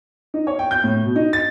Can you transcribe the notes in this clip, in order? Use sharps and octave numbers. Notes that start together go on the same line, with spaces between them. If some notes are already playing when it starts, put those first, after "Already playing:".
D#4
C#5
G5
G6
A2
B2
D#4
A6